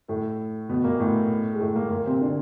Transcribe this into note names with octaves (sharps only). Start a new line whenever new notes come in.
A2 A3
B2 B3
A#2 A#3
A2 A3
G#3
A2 A3
A#2 A#3
A#2 A#3
C3 C4
D3 D4